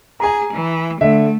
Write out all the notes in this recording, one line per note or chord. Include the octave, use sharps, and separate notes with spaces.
G#4 G#5 A#5
E3
D3 A3 E5